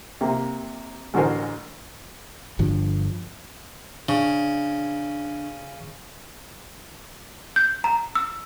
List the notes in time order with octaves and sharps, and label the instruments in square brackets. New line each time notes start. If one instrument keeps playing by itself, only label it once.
[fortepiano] C3 A#3
A1 D3 F#4 A#4 C5 G#5
[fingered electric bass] G1 G2 D3 F3
[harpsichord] C#3 [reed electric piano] D4
[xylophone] G6
A#5
E6